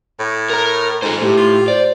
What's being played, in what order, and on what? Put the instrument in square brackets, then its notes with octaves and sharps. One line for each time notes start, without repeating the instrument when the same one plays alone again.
[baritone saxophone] A2
[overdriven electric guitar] A#4 A#5
[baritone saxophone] G#2 [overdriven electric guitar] A4 C5
[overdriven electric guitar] A2 [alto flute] G4
[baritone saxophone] F4
[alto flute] C5 [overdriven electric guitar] D5